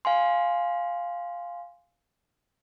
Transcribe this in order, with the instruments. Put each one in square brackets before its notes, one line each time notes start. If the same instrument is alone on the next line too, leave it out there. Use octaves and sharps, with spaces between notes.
[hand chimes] F5 G#5 C6